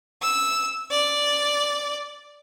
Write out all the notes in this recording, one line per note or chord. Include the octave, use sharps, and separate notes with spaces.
E6
D5